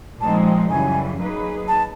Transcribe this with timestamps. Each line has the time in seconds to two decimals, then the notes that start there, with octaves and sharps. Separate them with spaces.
0.21 A#2 F3 G#3 C4 D#4 A5
0.70 F#2 C#3 E3 G3 G#5
1.19 F#3 A#3 D#4 G#4 B4
1.68 A5